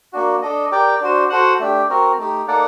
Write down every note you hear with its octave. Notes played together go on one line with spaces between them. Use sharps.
A#3 D4 F#4
D4 A4 D#5
G4 A#4 D5 G5
D4 F#4 C5
F#4 A4 C5 F#5
A3 D4 G4
C4 F#4 A#4
A3 D#4 G4
A#3 D#4 A4 D5 F#5